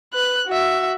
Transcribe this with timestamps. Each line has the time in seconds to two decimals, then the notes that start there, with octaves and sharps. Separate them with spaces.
0.13 B4 F#6
0.48 F#4 E5